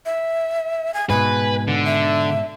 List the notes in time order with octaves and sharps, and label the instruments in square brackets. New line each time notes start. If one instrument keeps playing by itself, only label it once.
[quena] E5
G#5
[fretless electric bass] G#2 B2 [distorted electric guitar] B4 [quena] G#5
[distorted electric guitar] D3
[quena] E5